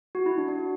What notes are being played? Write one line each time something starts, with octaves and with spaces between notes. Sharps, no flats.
F#4
E4
D4
D4
F#4